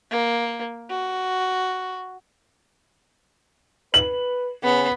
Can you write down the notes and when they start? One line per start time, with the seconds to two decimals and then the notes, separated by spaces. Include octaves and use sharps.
0.11 A#3
0.90 F#4
3.94 B4 F#7
4.64 C#3 B3